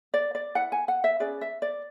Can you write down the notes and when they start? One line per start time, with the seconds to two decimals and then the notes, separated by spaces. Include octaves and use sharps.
0.14 D5
0.35 D5
0.55 E4 B4 F#5
0.72 G#5
0.88 F#5
1.04 E5
1.20 C#4 G#4 B4 D5
1.41 E5
1.62 D5